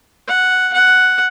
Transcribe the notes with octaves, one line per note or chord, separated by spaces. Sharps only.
F#5
F#5